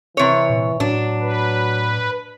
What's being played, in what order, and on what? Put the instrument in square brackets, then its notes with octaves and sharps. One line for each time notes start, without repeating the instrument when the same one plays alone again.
[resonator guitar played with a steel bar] C3 C#5 [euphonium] E3
[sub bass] A#2
[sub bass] A2 [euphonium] F#3 [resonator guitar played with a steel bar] D4
[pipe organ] B4